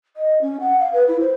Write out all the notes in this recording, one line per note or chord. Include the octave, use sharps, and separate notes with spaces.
D#5
C#4
F#5
F5
B4
E4
C5